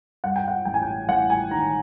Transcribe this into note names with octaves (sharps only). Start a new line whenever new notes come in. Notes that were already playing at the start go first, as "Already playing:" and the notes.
G2 F#5
G5
F#5
A1 G5
G#5
G5
A1 F#5
G#5
D#3 A#5